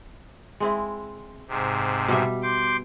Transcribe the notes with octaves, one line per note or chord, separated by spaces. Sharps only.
G#3 C4 E4
G#2 C3
B2 G3 E5
C6 D6 G6